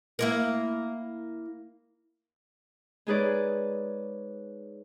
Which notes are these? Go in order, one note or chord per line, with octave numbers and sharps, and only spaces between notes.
A#3 E4 A#4
G#3 D#4 G#4 B4 C#5 D5